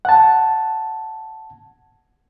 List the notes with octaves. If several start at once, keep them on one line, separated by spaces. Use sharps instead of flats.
F#5 A5